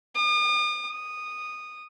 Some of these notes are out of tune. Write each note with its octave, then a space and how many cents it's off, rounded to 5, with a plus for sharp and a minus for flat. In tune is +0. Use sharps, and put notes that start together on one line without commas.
D#6 -45
D#6 -10